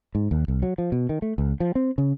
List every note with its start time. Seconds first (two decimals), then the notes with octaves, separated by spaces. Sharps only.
0.15 G#2
0.31 D#2
0.48 C2
0.62 F#3
0.78 F3
0.92 B2
1.09 D#3
1.22 A3
1.38 C#2
1.60 F3
1.75 C4
1.98 C#3